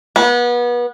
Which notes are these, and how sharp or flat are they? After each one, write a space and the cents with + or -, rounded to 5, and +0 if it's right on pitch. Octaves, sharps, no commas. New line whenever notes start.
B3 -30